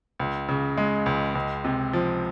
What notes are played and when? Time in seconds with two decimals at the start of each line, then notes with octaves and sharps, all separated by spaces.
0.20 C#2
0.49 C#3
0.77 G#3
1.06 C#2
1.35 C#2
1.65 C3
1.93 F3